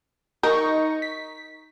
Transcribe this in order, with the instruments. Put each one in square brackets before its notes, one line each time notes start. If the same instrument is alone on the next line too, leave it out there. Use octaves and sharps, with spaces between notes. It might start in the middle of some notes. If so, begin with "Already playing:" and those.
[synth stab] D#4 C#6 [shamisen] A#4
[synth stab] B6